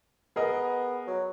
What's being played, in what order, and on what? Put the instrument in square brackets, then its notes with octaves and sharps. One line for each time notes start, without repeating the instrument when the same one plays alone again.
[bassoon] B3 [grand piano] G#4 A#4 D#5
[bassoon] F#3